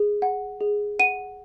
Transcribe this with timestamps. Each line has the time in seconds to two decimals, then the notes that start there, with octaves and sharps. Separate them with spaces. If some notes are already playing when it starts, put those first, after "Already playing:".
Already playing: G#4
0.22 F#5
0.61 G#4
0.99 F#5 D#7